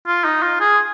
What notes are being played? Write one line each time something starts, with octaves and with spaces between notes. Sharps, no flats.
F4
D#4
F4
G#4